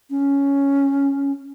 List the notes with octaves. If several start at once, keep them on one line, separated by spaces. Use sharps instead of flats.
C#4